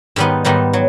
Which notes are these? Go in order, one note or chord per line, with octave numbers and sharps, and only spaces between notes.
G#2 D#3 G3 B3 D#4
G#2 D#3 G3 B3 D#4
F#3